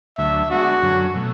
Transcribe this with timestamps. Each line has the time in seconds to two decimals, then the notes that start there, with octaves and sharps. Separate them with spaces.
0.17 D2 D3 F#3 A3 E5
0.50 G#3 B3 D4 F#4
0.82 F#2 D3 F#3 C#4
1.15 B2 F#3 A3